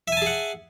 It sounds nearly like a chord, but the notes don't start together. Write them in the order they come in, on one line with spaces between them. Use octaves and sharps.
E5 G#5 A5 G#4 F#5